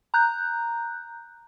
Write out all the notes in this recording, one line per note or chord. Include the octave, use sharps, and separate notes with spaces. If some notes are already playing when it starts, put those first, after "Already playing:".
A#5 F#6 G6